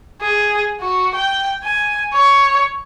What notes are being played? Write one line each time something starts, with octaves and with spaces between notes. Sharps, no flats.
G#4
F#4
G5
G#5
C#5